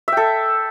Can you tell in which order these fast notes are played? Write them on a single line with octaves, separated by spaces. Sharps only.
E5 G5 A4